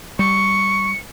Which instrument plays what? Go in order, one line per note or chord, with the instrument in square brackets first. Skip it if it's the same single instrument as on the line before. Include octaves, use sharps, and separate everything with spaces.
[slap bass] G3 [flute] C#6 [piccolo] C#7